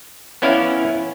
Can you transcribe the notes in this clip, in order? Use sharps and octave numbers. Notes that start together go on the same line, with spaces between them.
B3 C#4 E4 D5 F5